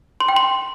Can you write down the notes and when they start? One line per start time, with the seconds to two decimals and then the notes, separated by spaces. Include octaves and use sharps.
0.20 C6
0.28 G5
0.36 C6